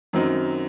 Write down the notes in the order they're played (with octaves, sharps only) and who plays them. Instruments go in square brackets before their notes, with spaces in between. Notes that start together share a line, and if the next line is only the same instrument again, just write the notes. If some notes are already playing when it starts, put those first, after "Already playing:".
[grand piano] F#2 D#3 F#3 C4 D#4